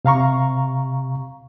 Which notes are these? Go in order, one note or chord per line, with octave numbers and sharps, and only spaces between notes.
C3 F5 A#5 C#6